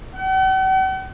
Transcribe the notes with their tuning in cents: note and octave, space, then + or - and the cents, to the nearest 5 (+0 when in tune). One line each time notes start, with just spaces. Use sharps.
F#5 +45